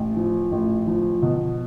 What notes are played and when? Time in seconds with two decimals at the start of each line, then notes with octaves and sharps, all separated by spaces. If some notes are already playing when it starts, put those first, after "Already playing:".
Already playing: A1
0.16 F3
0.52 A1
0.87 F3
1.22 B2